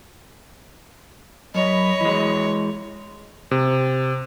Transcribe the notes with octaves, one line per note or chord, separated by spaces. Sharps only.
F#2 C#5 D#5 B5
E3 G#3
C3